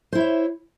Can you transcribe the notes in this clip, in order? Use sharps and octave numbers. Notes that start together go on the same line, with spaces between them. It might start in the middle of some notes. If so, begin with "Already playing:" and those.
E4 C5 C#5 E5